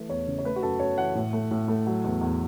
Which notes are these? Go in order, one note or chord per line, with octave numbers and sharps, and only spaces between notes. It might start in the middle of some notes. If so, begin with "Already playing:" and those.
Already playing: E3 A3
E2 C#5
C#3
C#5
A3 B4
F#4
F#2 A4
F#2 C#5
E3 F#5
A2
A3
A2
A3
F#3
E2
E2